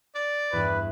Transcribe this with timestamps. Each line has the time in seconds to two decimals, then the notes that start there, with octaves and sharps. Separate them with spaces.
0.15 D5
0.53 E2 G2 B4